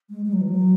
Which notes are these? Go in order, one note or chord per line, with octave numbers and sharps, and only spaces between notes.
G#3
G#3
F#3
E3
F#3